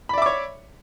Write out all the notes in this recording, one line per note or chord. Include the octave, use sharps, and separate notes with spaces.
C#5 D5 E5 B5 D6